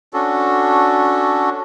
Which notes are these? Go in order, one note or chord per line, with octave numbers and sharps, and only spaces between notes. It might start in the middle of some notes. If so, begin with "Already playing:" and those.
C#4 D4 F#4 A4